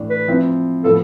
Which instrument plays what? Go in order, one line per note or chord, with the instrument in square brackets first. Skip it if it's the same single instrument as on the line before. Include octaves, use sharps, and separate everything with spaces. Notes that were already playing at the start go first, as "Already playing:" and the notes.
Already playing: [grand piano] A2 E3 A3 D4
[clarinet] B4
[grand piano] F3 C4 E4
[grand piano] A2 F3 B3 F4 [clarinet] A4